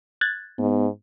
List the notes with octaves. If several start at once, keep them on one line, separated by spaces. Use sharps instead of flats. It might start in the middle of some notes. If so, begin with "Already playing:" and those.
F#6 G#6 A6
G#2 B3